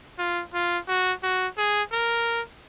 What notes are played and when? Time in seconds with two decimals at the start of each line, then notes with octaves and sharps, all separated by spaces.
0.19 F4
0.54 F4
0.88 F#4
1.23 F#4
1.57 G#4
1.92 A#4